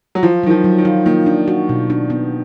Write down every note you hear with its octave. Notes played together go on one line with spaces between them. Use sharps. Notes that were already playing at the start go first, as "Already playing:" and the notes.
F#3
F3 F4
D#3 F#3
F3
F#3
D#3
F4
D#3 A#3
D4
F#4
B2
D4
B3